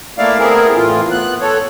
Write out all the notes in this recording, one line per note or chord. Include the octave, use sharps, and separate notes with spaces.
A3 A#3 E4 D5 F5
A3 B3 C4 E4 G#4 A#4
A2 E3 F4
B3 F#6
A4 C#5